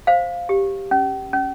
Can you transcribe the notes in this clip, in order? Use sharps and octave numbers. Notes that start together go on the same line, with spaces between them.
C5 F5
G4
C#4
C#4